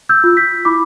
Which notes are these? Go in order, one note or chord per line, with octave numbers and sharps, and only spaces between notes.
E6 G6
F4
G6 B6
E4 B5 D6